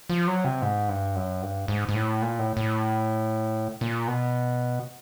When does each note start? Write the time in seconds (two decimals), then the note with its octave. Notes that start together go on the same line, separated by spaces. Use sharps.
0.10 F3
0.27 F#3
0.44 C3
0.62 G#2
0.89 G2
1.15 F#2
1.42 G2
1.68 G#2
1.89 G#2
1.95 A2
2.22 A#2
2.39 A2
2.57 A2
3.81 A#2
4.08 B2